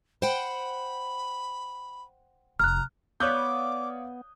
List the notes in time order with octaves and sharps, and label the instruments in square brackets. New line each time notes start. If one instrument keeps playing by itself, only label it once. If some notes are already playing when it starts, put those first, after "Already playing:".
[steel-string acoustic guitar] C5 F#5 G5 [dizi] B5
[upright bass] F1 [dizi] A#5 [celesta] F6 F#6
[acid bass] B3 [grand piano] C#5 F#6 G6 [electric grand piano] D5 F5 D#6 [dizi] D6